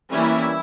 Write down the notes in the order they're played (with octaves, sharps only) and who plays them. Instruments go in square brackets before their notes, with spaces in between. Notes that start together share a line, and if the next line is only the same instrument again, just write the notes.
[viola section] E3 G3 A#3 C#4 E4